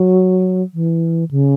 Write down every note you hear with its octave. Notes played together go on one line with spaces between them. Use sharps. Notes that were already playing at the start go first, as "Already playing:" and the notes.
Already playing: F#3
E3
C#3